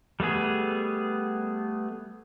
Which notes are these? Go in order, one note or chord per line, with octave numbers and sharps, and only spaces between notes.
G3 A3 B3 G#4